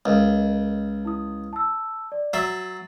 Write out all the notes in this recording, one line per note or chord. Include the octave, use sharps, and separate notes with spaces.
C#2 A#4 D#5
E4 D#6
A5 E6
D5
F#3 E5 A6 C7